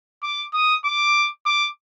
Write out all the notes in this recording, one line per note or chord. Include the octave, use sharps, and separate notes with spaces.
D6
D#6
D6
D6